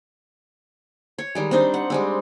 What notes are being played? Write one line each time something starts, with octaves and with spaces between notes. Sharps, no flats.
C#5
D#3 G3 G#3
C4 D4 D#4 C5
F#5
G3 G#3 C4